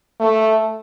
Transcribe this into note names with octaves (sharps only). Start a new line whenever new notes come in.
A3